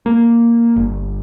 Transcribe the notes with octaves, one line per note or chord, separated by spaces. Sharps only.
A#3
G1